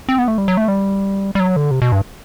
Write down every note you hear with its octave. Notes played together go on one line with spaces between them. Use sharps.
C4
B3
A3
G3
F#3
A3
G3
G3
F#3
D3
C3
B2
G2